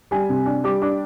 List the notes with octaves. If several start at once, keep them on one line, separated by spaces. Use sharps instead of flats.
G3 G#5
C3
D4
G3 D6
D4 D6